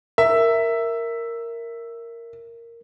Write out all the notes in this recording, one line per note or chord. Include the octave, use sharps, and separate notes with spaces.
A#4 E5